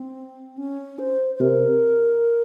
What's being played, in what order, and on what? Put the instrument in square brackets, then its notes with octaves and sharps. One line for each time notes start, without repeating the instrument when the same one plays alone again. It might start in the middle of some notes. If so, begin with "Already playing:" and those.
Already playing: [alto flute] C4
C#4
C5
C5
[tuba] C3 [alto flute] A#4